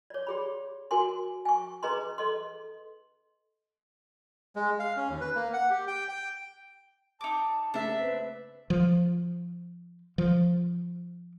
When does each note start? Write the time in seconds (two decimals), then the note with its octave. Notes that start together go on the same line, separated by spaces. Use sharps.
0.10 C#5 D5
0.27 G4 G#4 B5
0.91 F#4 A#4 G#5 C6
1.45 G#5 C#6
1.83 C#4 G#4 B4 D#5 A#5 C6
2.18 A4 D#5 C6
4.56 G#3
4.80 F5
4.97 C#4
5.09 D#2
5.21 B4
5.35 A#3
5.53 F#5
5.70 G4
5.88 G5
6.09 G5
7.21 D#4 A5 D6
7.74 C#3 A3 A#3 D4 E5
8.00 C4 B4
8.70 F3
10.18 F3